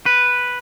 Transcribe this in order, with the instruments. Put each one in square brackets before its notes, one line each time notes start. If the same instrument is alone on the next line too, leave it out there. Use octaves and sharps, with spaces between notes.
[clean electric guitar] B4